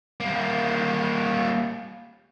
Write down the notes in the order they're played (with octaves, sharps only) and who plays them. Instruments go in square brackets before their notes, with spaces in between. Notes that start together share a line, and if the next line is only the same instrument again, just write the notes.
[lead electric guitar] G3 A#3